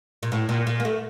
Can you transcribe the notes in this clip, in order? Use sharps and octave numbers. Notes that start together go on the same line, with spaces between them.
A#2
A2
A#2
A#2
A#3
A3